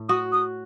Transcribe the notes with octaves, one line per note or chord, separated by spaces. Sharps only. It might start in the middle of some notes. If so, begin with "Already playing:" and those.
Already playing: A2
F#4 D#6
D#6